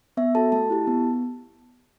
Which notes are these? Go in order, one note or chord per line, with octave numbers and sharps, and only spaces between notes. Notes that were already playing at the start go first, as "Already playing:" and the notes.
B3 E5
F#4 A4 A5
A3 A5
E4 G4
B3